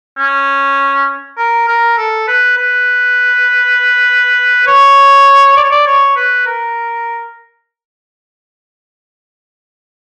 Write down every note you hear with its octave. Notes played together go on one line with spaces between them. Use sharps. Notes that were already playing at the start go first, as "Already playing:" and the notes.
C#4
A#4
A#4
A4
B4
B4
C#5
D5
C#5
D5
C#5
B4
A#4